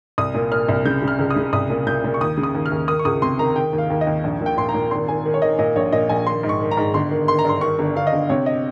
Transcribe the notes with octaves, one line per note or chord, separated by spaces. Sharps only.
C2 D#6
A#2
A#2 F6
C2
C#3 G6
C#3
F6
C#2
D#6
C#3
C2 D#6
A#2
A#2 G6
A#2
C#6
D#2 D#6
C#3
D#6
D#2
F6
D#2
D#3 D#6
C#6
C#2 D#6
C3 C6
D#3 A#5
D#3 G5
D#2
F5
D#2
D#5
D#2
A#1
A#2
G5
A#2 C6
A#5
A#2
G#1 C6
G#1 G#5
D#3
C#5
D#3 D#5
A#2 D#5
A#1 C#5
A#2 D#5
A#1 G#5
D#3 C6
G#2
C#6
D#3
A#5
G#2
G1 C6
D#3
D#3 C6
A#5
G2 C6
D#3 C#6
G1
G1 F5
D#5
G1
C3 C#5
D#5